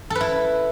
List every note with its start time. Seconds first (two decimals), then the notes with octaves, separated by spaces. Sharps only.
0.10 A4
0.15 B4
0.20 E4